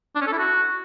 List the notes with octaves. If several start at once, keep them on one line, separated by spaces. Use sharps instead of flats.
D4
C#4
A4
E4
F#4